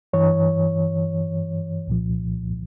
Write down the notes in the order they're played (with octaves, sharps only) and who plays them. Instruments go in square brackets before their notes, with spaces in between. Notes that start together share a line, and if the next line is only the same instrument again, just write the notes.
[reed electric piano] G2 E3 C#5
C2 A#2 F3